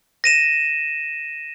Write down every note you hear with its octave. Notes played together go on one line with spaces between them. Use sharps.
A#6 D#7 E7